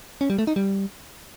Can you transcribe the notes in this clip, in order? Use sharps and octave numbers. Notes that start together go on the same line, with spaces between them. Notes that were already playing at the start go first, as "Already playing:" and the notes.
C#4
G3
A3
D#4
G3